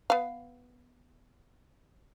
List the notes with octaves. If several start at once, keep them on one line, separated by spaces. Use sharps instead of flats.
B3 F5